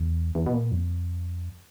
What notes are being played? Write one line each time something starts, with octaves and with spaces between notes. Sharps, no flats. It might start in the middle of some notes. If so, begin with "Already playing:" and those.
Already playing: E2
E2
B2
A#2
F2